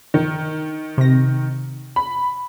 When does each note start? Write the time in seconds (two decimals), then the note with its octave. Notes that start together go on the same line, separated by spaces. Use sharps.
0.14 D#3
0.98 C3 A#6
1.96 B5